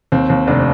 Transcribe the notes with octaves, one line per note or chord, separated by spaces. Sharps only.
D#2 C4
D#2
F1 D4